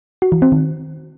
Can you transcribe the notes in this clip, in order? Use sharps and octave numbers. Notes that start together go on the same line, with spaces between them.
F#4
E3
C4
D#3